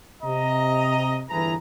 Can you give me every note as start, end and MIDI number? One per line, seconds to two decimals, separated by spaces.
0.22 1.23 48
0.22 1.23 75
0.22 1.23 82
1.29 1.54 31
1.29 1.54 52
1.29 1.54 64
1.29 1.54 68
1.29 1.54 71
1.29 1.54 82